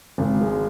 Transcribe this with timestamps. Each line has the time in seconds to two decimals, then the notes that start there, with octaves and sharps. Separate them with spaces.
0.18 G#1
0.41 G#3